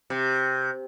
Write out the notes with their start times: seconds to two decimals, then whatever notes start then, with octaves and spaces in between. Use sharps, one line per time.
0.10 C3